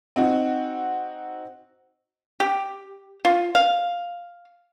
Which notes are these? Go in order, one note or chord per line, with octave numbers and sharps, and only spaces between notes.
C4 D#4 F#4
G4
F4
F5